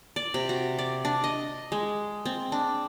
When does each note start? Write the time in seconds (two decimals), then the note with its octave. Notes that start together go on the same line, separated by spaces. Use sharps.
0.16 D5
0.34 C3
0.49 F#4
0.79 D5
1.05 D4
1.24 D#5
1.72 G#3
2.25 C4
2.52 D4